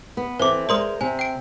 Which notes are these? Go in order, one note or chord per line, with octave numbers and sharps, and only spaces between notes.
B3
E3 C4 A4 C5 D6
G#3 A#4 C5 D5 C6 D#6
C3 G#5
G5 D7